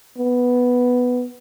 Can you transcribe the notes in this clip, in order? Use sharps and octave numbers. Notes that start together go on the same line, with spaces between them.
B3